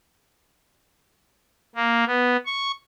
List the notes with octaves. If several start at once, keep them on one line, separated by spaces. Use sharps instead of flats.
A#3
B3
C#6